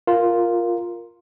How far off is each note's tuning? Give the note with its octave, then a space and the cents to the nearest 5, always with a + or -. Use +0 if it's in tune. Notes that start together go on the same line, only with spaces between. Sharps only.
F4 +0 A#4 +0